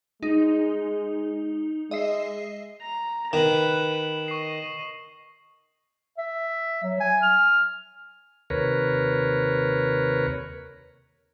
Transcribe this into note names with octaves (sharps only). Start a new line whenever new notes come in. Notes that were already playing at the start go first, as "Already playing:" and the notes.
G#3 D#4
G#3 D#5 E5 C7
A#5
D#3 B4 E7 F#7
D#5 C#6 C7
E5
F#3
G#5
F6
D#2 C3 A#4 B4 C#5